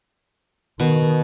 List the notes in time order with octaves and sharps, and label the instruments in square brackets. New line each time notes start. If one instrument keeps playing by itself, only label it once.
[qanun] B2 [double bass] D#3